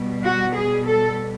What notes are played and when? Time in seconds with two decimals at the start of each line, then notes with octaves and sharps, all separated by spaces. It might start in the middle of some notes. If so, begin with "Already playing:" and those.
Already playing: B2 G3
0.24 F#4
0.55 G#4
0.86 A4